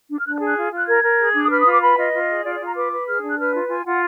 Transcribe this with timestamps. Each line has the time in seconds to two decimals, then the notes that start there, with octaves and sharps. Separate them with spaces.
0.09 D4
0.19 F6
0.25 D4 F#6
0.35 F#6
0.40 G#4
0.45 F#6
0.56 F4
0.72 F4
0.77 F#6
0.87 A#4 G#6
1.03 A#4
1.18 G#4
1.34 D4
1.42 D#6
1.50 B4 F6
1.60 D#6
1.66 F4
1.71 D6
1.81 B4 B5
1.97 F4 D#5
2.13 F4
2.28 G#4
2.44 F4 D5
2.54 D5
2.59 F4
2.65 A#5
2.75 B4 D6
2.91 B4
3.07 G#4 F6
3.22 D4
3.28 F#6
3.38 B4 F6
3.54 F4
3.69 F4 G#5
3.85 F4 F#5